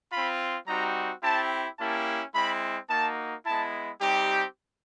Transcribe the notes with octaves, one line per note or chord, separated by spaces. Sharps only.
C4 F4 B5
G3 C4 D#4 F#4 A#5
C4 E4 G4 A5
A#3 C#4 E4 G4 A5
G#3 C4 E4 B5
A#3 D#4 F#4 A5
G#3 B3 E4 A5
G3 C4 D#4 G4